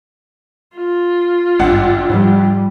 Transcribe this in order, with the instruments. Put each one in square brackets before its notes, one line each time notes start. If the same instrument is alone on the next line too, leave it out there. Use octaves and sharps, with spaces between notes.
[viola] F4
[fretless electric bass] G#1 G2 [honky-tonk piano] C#2 D4 F#5
[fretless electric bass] G#2 F3 [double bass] G3